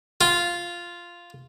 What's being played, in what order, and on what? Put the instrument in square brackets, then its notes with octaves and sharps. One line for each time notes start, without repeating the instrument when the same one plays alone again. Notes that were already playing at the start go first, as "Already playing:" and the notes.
[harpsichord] F4